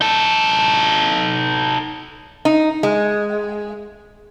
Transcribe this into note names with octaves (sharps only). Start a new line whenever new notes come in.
D#4 A4
D#4
G#3